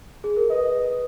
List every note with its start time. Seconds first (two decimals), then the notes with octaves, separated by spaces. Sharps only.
0.24 G#4
0.37 A#4
0.50 B4 D#5